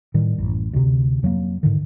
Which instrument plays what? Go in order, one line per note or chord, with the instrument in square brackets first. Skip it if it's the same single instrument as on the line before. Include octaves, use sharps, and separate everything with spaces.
[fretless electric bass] A2 D#3 G3
A1 F#2
D2 C3
F2 F#3 G3 A#3
G#2 D3 D#3